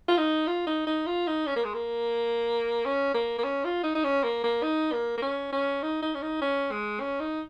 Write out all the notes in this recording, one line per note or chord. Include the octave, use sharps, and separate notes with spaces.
F4
D#4
F4
D#4
D#4
F4
D#4
C#4
A#3
G#3
A#3
C#4
A#3
A#3
C#4
F4
D#4
D#4
C#4
A#3
A#3
D#4
A#3
A#3
C#4
C#4
D#4
D#4
C#4
D#4
C#4
G#3
C#4
D#4